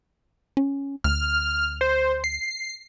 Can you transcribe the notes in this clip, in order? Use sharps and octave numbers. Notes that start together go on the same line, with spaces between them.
C#4
D2 F6
C5
C7